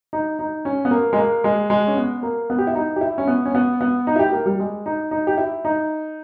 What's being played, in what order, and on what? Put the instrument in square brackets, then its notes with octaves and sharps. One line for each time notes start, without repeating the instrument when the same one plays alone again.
[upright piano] D#4
D#4
C#4
B3
A#3
G#3
A#3
G#3
G#3
C#4
B3
A#3
B3
G4
E4
D#4
G4
E4
C#4
B3
C#4
B3
B3
D#4
E4
G4
A#3
G3
G#3
D#4
D#4
G4
E4
D#4